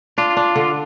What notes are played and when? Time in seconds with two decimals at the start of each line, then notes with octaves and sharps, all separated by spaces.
0.18 D4 F4
0.37 D4
0.56 D3